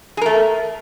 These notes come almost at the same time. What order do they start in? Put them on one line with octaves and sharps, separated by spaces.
G#4 A#4 A3